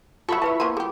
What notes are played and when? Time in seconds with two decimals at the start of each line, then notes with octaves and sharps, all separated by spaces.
0.29 F#3 F4 A4 E5 B5 C#6
0.42 E4 B4 A5 E6
0.60 A#3 C5 A5
0.77 G3 G4 G#4